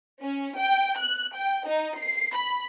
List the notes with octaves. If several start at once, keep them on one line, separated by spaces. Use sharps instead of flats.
C#4
G5
F#6
G5
D#4
C7
B5